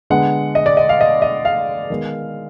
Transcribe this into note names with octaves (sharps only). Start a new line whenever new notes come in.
D3 G#3 B3 F#5
D#5
D5
D#5
F5
D#5
D#5
F5
D#3 G#3 B3